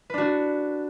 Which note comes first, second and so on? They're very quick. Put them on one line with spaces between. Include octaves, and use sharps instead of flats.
B4 D4 F#4